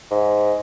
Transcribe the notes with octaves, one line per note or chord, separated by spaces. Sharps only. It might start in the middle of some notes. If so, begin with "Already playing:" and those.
G#2